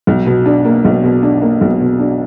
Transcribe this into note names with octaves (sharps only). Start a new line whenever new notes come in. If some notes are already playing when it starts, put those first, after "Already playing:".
B1
B2
D4
A#3
B1
B2
D4
A#3
B1
B2
D4